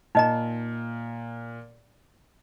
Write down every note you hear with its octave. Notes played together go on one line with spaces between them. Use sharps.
A#2 D#4 D#5 A#5